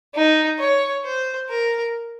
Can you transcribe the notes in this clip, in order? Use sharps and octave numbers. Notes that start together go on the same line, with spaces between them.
D#4
C#5
C5
A#4